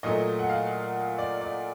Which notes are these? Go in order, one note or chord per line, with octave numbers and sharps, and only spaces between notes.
A#2 F#3 A3 D#5
F#5
F5
D5
D5